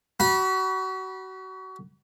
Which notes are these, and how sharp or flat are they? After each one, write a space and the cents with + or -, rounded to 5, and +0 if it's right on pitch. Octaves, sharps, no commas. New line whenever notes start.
F#4 +30 B5 -25